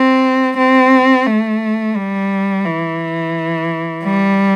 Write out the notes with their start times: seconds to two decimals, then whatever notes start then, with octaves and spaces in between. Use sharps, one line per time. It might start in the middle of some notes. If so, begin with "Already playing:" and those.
Already playing: C4
0.57 C4
1.26 A3
1.95 G3
2.65 E3
4.04 G3